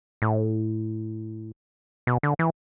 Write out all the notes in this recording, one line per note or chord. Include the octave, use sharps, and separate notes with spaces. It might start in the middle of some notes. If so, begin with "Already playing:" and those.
A2
B2
D3
E3